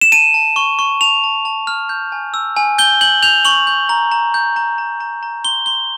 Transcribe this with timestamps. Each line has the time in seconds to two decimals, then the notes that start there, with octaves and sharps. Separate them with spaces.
0.01 E7
0.12 A5 D#7
0.34 A5
0.56 C#6
0.79 C#6
1.01 A5 F7
1.24 A5
1.45 A5
1.67 F6
1.89 G6
2.12 G#5
2.34 E6
2.56 G#5
2.78 G6 G7
3.01 G6 F#7
3.23 G6 F7
3.45 C#6 F#7
3.67 G6
3.89 A#5
4.12 A#5
4.34 G6
4.56 A#5
4.78 A#5
5.00 A#5
5.23 A#5
5.45 C6 G7
5.66 C6 G7